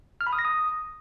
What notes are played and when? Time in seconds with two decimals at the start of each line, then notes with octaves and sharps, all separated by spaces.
0.21 F6
0.27 B5
0.33 D#6
0.39 A#6
0.45 D#6